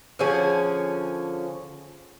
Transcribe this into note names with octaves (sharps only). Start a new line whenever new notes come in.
D3 F3 C#4 G#4